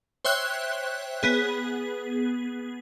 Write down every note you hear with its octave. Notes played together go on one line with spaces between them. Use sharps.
C5 C#5 E5 G5 F#6
B3 G#4